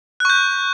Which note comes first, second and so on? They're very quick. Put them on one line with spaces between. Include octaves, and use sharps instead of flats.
F#6 C#6 G6